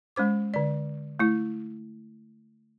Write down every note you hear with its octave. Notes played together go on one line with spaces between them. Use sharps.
G#3 C#4 C5 D6
D3 D5
A3 E4